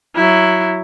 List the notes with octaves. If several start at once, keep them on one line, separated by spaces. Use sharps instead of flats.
F#3 E4